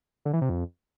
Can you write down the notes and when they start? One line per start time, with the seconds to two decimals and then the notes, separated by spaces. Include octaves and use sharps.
0.25 D3
0.33 E3
0.41 C3
0.50 F2